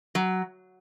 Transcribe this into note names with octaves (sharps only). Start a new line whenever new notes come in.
F#3